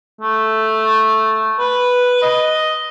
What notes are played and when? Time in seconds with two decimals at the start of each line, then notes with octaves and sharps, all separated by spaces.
0.22 A3
1.60 B4
2.23 D#5